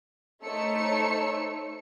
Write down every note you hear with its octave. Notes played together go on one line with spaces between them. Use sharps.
A3 D#4 C5 C#5 E6 C#7